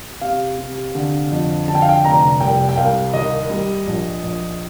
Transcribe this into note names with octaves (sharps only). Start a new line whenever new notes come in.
C3 F5
C3
D3
F2
D3 A5
G5
F5
G5
F1 A#5
C2 G5
G5
C2 F5
D#2 D#5
G3
A#1
A#1